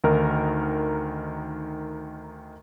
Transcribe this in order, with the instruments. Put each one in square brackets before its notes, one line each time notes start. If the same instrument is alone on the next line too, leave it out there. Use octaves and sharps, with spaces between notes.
[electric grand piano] D2 D#3 D#4 A#4